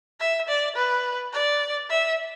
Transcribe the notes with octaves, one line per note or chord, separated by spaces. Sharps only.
E5
D5
B4
D5
E5